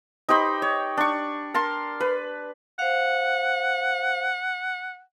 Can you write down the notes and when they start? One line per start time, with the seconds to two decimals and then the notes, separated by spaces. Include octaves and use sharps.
0.29 D#4 G4 C5 B5
0.62 C#5
0.97 D4 C#6
1.54 A#4 A5 C6
2.00 B4
2.79 C5 F5 F#5